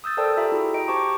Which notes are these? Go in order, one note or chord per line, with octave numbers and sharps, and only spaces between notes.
D#6 E6 G6 A6
A4 A#4 C5 D5 G5 A5
F4 G4 A4 E5 G5 A#5
E4 F#4 G#4
D#5 G5 A#5 D7
G4 C5 A5 C#6 D6